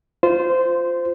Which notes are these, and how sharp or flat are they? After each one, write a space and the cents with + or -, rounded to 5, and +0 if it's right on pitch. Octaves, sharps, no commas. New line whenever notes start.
F4 +0 C5 -15